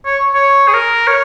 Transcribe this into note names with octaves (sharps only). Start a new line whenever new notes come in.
C#5
C#5
G#4
A#4
C#5